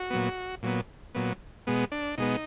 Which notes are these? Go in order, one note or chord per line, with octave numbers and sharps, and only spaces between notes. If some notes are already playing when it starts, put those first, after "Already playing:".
Already playing: F#4
A#2 F#3 B3
A#2 F#3 B3
A#2 F#3 B3
B2 G#3 B3
D4
B2 G#3 B3 D#4